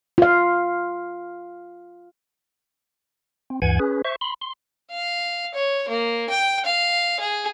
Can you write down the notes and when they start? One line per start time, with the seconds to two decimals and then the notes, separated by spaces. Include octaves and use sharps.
0.18 F4 F5
3.50 C4
3.62 D2 G2 E3 F#5 G#5 G#6
3.79 C#4 G#4 B4
4.05 C5 E5 C#6
4.21 B5 C6
4.41 C6
4.91 F5
5.54 C#5
5.88 A#3
6.29 G5
6.65 F5
7.20 G#4